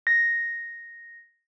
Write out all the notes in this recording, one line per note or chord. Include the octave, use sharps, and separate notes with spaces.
A#6